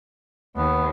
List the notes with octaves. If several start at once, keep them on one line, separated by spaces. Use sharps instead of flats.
D#2 B3